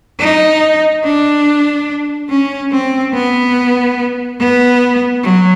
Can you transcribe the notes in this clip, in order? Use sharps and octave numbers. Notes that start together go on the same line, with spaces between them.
D#4
D4
C#4
C4
B3
B3
F#3